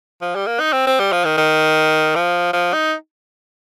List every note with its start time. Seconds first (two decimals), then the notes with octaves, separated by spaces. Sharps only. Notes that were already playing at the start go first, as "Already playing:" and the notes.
0.22 F3
0.35 G3
0.47 A#3
0.60 D#4
0.73 C4
0.87 C4
1.00 G3
1.12 F3
1.25 D#3
1.38 D#3
2.15 F3
2.53 F3
2.73 D#4